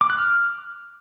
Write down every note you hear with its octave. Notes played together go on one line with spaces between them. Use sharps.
D6
F#6
F6